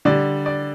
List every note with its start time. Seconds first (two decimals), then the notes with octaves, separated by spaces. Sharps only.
0.05 D3 G3 D5
0.46 D5